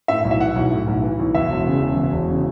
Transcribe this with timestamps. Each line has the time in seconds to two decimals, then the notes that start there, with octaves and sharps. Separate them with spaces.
0.08 A2 E5
0.24 B1
0.31 E5
0.40 E3 F#5
0.55 B1
0.72 A2
0.87 B1
1.03 E3
1.19 B1
1.35 E2 E5
1.50 E1
1.66 C#3
1.81 E1
1.97 E2
2.12 E1
2.29 C#3